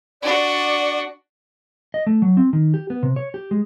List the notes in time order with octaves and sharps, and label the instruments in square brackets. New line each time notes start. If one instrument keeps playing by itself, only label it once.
[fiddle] D4 F#4 [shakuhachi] D5
[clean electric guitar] D#5
A3
F#3
C4
D#3
G4
B3
C3
C#5
G4
G#3